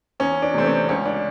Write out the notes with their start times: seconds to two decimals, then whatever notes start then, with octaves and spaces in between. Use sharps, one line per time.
0.20 E2 C#4
0.42 D4
0.54 C3 E3 A3 C4
0.66 C#4
0.89 C#2 C#4
1.06 D4